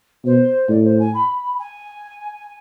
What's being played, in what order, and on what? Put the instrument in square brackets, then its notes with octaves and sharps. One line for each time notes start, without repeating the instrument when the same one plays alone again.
[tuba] B2 [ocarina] C5
[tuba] A2 [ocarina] D5
[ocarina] C5
G#5
B5
G#5